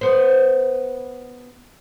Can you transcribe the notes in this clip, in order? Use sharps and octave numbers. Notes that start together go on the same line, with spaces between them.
B3 C5